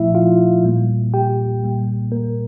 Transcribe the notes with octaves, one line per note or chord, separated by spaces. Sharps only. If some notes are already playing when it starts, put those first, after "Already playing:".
Already playing: A#2 F3 A3 E4 E5
F4 F5
A#2 G3 A#3
G4 G5
A#2 G3 A#3
A#3 A#4